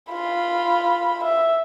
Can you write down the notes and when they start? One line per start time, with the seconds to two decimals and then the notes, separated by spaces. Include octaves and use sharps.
0.12 F4 B5
1.24 E5